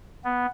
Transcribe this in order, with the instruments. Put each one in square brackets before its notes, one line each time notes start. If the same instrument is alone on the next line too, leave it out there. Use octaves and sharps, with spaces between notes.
[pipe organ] B3